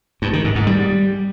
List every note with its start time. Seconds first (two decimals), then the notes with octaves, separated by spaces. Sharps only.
0.22 G2
0.33 D#3
0.44 G#2
0.56 G#2
0.67 G3